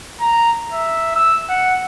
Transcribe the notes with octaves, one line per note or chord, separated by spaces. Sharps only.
A#5
E5
E6
F#5